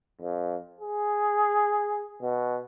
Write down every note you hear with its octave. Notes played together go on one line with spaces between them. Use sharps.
F2
G#4
B2